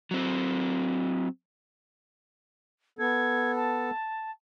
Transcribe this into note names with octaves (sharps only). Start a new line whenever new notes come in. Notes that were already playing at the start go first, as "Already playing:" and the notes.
F#3 C4
B3 A4 G#6
A5